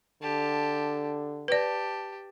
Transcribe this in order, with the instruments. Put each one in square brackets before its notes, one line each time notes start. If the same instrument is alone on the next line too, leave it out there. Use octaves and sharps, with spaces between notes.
[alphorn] D3 [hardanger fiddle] G4 A5
[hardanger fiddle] G4 A5 [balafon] B4 D5